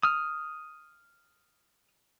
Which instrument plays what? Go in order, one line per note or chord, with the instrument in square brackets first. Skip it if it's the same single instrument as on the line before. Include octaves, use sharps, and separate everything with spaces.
[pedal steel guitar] D#6 F6